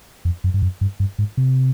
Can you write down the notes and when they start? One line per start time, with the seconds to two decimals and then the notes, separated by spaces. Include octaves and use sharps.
0.25 F2
0.44 F#2
0.54 G2
0.62 F#2
0.81 G2
1.00 G2
1.19 G#2
1.37 C3